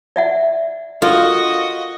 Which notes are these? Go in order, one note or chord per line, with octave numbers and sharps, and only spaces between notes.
D5 E5 F#5
F4 F#4 A4 A#4 D#5